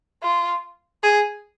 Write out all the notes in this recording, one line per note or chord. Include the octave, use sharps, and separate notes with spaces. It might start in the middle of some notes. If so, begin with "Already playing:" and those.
F4
G#4